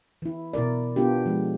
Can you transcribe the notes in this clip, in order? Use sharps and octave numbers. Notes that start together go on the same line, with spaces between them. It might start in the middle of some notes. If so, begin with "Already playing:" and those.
E3 E4
B2 E4 A#4 D5
B3 D4 F4 G4
F3 G#3